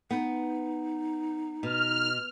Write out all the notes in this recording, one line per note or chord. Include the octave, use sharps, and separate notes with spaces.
B3 D#4
B2 F6